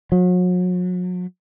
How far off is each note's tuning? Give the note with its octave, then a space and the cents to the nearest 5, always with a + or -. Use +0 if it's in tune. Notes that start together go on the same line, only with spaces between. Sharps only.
F#3 -40